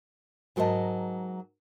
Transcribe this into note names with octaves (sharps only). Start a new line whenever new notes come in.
G#2 F#3 A#4 C5 D#5 A5